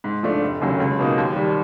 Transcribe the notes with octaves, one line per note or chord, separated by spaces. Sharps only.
G#2
F3 A3 D4
F1
D#2 C#3 F#3 A3
C#2
B2 F#3 A#3 D#4
D#2
D#3 G3